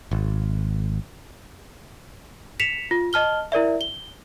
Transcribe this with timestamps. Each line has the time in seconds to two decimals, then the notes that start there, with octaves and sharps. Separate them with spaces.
0.11 G#1
2.60 B6 C#7 E7 F7
2.91 F4
3.13 D#5 A5 F6 G7
3.52 E4 A#4 D5 E5
3.81 G7